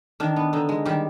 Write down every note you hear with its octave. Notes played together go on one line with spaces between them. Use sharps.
D#3 D4
B3
D3 D#4
G#3
D#3 G3 G4